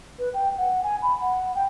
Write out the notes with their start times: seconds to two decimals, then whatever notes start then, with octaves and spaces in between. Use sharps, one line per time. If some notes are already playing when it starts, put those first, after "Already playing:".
0.19 B4
0.34 G5
0.58 F#5
0.83 G#5
1.02 B5
1.21 F#5
1.55 G5